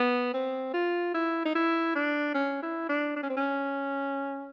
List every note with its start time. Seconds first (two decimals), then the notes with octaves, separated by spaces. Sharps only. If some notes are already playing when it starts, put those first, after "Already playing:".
Already playing: B3
0.34 C4
0.73 F4
1.14 E4
1.45 D#4
1.55 E4
1.95 D4
2.34 C#4
2.62 E4
2.89 D4
3.16 D4
3.23 C#4
3.29 C4
3.36 C#4